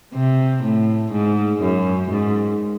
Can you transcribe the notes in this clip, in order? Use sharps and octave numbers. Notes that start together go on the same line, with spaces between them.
C3
A2
G#2
F#2
G#2